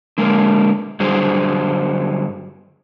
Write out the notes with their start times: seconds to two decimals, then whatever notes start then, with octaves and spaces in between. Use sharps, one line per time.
0.18 D3 G#3 A#3 A#4
1.00 G2 D3 F#3 G3 G#4 C5